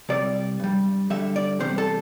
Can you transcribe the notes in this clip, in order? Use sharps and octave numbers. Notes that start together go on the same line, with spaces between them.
C2 C3 G3 D5
G2 G3
G2 D3 G3 E5
D5
E2 C3 G3 C5
A4